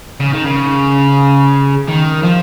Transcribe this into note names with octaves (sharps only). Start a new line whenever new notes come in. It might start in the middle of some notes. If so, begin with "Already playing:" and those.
C#3
D#3
C#3
D#3
F3